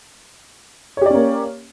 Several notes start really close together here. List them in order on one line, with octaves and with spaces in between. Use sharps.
C#5 G4 D5 C#4 A#3